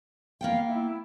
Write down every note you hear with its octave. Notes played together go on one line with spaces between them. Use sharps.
A#3 B3 F5 G5
E4